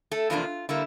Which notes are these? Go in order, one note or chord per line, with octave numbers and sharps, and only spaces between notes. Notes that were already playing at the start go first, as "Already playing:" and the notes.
A3 A4
E2 C3 F3 A#3 D4 F4
D3 G3 A#3 E4